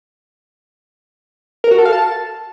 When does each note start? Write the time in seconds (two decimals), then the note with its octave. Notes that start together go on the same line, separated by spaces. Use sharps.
1.64 A#4
1.71 F#4
1.78 A4
1.85 F5
1.93 A5